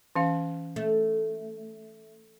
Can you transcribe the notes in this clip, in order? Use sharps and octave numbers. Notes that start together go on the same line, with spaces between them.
E3 C#4 F5
A3